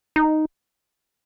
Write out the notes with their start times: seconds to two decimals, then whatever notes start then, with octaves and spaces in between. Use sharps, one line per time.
0.16 D#4